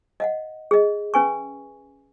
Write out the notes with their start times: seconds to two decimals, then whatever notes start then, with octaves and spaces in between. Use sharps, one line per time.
0.20 D#5 F5 F#5
0.71 G#4 D#5
1.14 C#4 B4 G#5 C#6